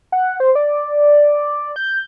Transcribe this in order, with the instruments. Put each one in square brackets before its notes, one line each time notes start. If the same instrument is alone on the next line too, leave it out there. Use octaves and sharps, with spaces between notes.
[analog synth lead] F#5
C5
D5
G6